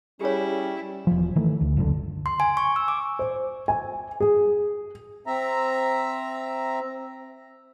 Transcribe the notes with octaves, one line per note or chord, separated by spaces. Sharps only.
G3 C#4 E4 G4 G#4 C#5
E1 F3
D#3 E3 A3
D2
F#1 C#2 A#2 D3
C6
G#5
C#6
E6
D6
C5
G#5
G#4
C4 E5 A#5